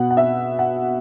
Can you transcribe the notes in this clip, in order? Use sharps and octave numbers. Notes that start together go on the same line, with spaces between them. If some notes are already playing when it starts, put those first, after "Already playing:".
Already playing: B2 F#5
F#5
E5
F#5